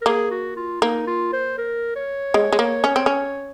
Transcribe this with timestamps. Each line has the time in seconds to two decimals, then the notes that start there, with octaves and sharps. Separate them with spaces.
0.02 A#4
0.06 A#3 G#4
0.31 F#4
0.57 F4
0.81 A#3 D#4
1.07 F4
1.33 C5
1.58 A#4
1.96 C#5
2.34 G#3
2.52 G#3
2.59 A#3
2.84 C#4
2.96 C4
3.06 C#4